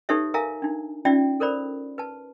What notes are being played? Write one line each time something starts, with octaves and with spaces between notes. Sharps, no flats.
D#4 G4 A4 B4 C#5 E5
A#4 E5 F5 G#5 A#5
D4 D#4
C#4 D#4 F4 D5 E5 G5
A4 A#4 C5 D5 B5
B4 A5